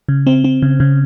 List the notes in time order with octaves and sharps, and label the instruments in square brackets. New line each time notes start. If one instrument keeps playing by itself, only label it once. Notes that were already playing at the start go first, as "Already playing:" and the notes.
[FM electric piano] C#3
C4
C4
C#3
C#3